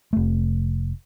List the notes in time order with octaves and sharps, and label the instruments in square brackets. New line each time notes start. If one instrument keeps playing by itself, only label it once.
[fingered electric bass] F1 A3